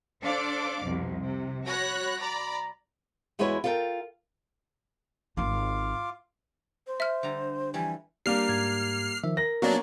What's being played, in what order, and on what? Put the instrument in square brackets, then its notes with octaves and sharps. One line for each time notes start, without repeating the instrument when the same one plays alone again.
[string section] D4 A4 C5 D5 F5 D6
C2 F2 B2
C3
F#4 C#5 B5 F#6 A#6
D5 A#5 B5
[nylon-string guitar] E2 G#3 E4 F#4 B4 C#5
F4 A4 A#4 E5 G5
[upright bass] G#1 D#4 [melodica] F4 F5 D6
[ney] C5
[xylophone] E5 F6
[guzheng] D3 G3 A#5
[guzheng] F2 E3 G3 [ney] G#5
[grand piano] G3 A#3 D4 [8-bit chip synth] F6 C7
[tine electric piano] G#2 G#6
D#3 F3 E5
[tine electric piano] A#4 [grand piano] A#6
[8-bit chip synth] F#3 D4 [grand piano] A#3 B3 C#4